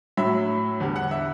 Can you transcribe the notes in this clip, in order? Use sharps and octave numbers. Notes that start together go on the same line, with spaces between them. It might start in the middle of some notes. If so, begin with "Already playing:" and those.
A2 F#3 E5
E2 D3 G3
F#5
E5